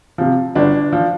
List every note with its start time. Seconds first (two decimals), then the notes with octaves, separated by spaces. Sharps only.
0.18 C3 F3
0.55 G1 D4
0.93 F3